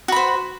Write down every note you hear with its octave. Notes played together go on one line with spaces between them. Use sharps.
F#4 C5 B5